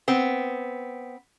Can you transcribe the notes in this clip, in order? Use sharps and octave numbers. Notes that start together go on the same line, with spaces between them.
B3 C4